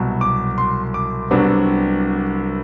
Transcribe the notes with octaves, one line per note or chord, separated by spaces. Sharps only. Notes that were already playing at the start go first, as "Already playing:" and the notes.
Already playing: C2 B2 F#3
D6
C6
D6
C2 C3 F#3 B3 D4